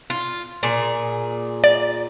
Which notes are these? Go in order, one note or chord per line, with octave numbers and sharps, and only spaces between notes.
F4
A#2 G#4
D5